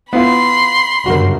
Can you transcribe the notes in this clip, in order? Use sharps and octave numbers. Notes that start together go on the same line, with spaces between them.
B3 E4 F4 B5 C6
G1 F#2 C#3 F#4 A#4